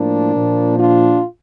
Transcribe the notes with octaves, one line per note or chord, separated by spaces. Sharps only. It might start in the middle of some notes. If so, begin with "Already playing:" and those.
Already playing: A2 F3 A#3 D4
A#2 F3
D4 F4